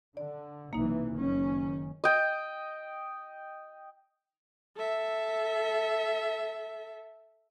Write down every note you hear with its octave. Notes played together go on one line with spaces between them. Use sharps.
D3 D5
B1 C3 E3 A#3 D#4
F#1 D#3 C#4
D#5 G5
A4 E5